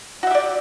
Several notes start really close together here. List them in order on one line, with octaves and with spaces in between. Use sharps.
F#4 E5 G4 D5